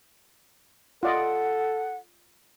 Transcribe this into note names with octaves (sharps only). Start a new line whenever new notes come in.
F4 A4 D5 D#5 F#5